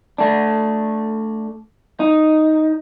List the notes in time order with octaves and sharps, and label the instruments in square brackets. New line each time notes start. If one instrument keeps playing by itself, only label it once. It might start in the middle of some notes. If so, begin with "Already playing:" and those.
[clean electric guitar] A3 D4
D#4